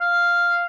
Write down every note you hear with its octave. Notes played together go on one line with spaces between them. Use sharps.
F5